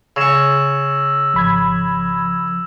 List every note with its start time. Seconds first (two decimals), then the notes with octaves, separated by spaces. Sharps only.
0.16 C#3 C#6 E6 A#6 E7
1.34 G#1 F3 B5 G#6